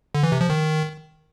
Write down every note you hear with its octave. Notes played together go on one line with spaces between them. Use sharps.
D3
E3
C3
F3
D#3